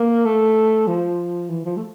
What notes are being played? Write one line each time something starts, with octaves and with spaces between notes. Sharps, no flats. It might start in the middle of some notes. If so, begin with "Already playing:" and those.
Already playing: A#3
A3
F3
E3
F3
A3